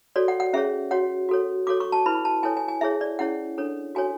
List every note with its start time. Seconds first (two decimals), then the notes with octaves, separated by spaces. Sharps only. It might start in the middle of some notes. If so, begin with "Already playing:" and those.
0.16 F#4 A4 C#5 D5
0.28 F#5
0.40 F#5
0.53 C#4 G#4 C#5 E5
0.91 F#4 C#5 F#5
1.29 F#4 A4 C#5
1.67 F#4 A4 C#5 D6
1.80 C#6
1.92 A5
2.06 E4 B4 B5
2.25 A5
2.43 E4 A4 C#5 G#5
2.57 G#5
2.68 G#5
2.81 E4 G#4 C#5 E5
3.01 D5
3.19 C#4 E4 G#4 C#5 F#5
3.58 D4 A4 C#5
3.95 F#4 A4 C#5 G#5